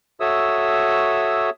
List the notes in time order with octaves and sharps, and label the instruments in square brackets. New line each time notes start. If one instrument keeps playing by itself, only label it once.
[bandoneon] F#4 A4 C#5 E5 D#6 E6